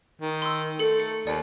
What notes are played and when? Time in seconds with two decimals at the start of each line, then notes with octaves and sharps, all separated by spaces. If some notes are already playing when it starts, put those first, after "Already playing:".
0.22 D#3
0.42 C6 E6
0.79 A3 A4 C#7
0.99 C#7
1.27 D#2 D5